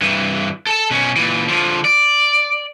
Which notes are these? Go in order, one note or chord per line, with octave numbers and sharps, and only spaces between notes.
G2 E3
A4 A5
B2 C#4
A#2 E3
D3 F3
D5